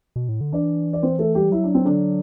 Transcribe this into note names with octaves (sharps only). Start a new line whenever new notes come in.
B2
A2
D3
E3 D4 D5
D5
C4 C5
A3 A4
G3 G4
F#3 E4
D4
C4
D3 D4